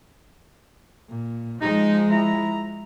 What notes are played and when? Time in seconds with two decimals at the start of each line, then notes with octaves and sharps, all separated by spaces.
1.09 A#2
1.62 F3 G#3 D#4
2.11 E4 A#5